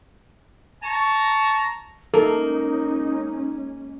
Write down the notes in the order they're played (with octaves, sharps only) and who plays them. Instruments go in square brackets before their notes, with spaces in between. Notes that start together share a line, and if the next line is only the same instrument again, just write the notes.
[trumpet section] A5 A#5 C#6
[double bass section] G#3 C#4 [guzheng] A#3 [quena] D#4 [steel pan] A4